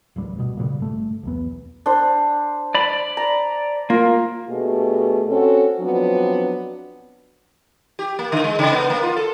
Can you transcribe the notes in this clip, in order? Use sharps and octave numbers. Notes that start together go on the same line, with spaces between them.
D1 A1 G3
G1 B2
A#2 C#3 F3 G3
G1 A3
B1 E2 B3
D4 C5
D5 B5
A#5
A#3 F4
B2 A3 D4 G4 G#4
C4 C#4 F#4 A4
F3 F#3 B3 C4 D4
G4
A#3
D3
G#3
C#3
B3
A#3
F4
A4